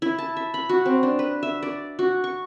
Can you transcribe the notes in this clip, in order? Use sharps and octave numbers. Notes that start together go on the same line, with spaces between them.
E4
A5
E5
B5
F#4
C4
D4
B4
E5
D5
F#4
C#6